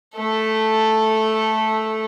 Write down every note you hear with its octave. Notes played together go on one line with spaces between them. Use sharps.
A3 A4